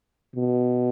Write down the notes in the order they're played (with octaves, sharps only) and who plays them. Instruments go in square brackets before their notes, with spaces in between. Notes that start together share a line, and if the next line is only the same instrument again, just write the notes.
[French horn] B2